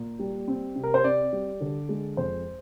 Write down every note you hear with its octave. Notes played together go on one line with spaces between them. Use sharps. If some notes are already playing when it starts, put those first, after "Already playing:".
Already playing: A#2 A#3
G3
C4
C3
A#4
C5
C4 D5
G3
D3
G#3
F2 C5